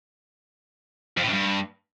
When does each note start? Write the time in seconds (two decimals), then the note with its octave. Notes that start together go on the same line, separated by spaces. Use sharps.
1.17 F2
1.22 A2
1.28 F#2
1.33 G2